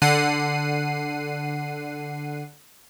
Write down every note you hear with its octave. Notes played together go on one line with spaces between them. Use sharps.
D3 F#5 C7 D#7